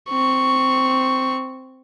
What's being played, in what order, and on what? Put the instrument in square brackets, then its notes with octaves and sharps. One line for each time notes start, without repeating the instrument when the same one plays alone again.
[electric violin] C4 C#6